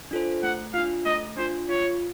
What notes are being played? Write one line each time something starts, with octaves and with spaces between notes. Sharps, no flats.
D4 F4 A4 C5
A3 F#5
D4 F4 F5
A3 D#5
D4 F4 C5
F4 C#5